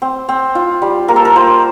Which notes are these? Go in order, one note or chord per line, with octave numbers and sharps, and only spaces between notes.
C4
C4
F4
G3
A#3 A#4
A4
A#4
F4 C5